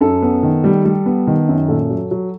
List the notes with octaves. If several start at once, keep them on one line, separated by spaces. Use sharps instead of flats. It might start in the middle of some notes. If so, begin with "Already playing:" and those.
F#2 A4
B3
D#3
G3
G3
B3
D#3
F#2
A#2 A4
F#3
F#3